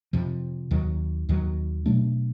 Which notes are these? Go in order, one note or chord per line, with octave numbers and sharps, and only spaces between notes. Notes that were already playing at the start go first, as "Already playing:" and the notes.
F2 C3 F3
D#2 D#3 F#3
D#2 D#3 F#3
B2 F#3 A3 D4